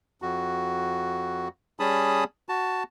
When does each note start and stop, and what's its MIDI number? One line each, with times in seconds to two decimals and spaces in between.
0.22 1.48 41
0.22 1.48 66
1.80 2.24 55
1.80 2.24 61
1.80 2.24 68
1.80 2.24 81
1.80 2.24 83
1.80 2.24 87
2.49 2.83 66
2.49 2.83 81